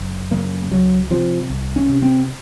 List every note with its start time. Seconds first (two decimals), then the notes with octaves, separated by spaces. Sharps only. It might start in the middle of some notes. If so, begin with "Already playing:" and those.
Already playing: F#1
0.31 F#2 C#3 A#3
0.71 C#2 F#3
1.10 C3 F3
1.50 C2
1.76 C#4
1.89 C3
2.02 C4